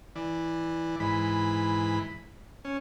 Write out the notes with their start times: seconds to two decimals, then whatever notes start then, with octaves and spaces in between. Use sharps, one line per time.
0.16 E3 D5
1.00 G#2 E3 B5
2.65 C#4